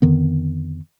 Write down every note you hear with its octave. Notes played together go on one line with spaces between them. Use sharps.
F2 D3 D#3 B3